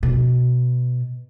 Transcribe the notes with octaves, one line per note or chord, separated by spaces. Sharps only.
B2